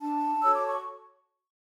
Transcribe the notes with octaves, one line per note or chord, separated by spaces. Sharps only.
D4 A5
F#4 A4 C#5 E6
D6
C#6